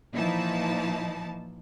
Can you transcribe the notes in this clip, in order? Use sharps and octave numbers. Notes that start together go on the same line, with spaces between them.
A#2 E3 F3 D#4 E4 A5